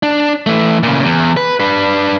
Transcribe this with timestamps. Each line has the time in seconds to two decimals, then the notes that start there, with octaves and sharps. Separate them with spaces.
0.03 D4
0.46 E3 A3
0.83 A#2 C#3
1.04 E2
1.37 B4
1.60 D4 B4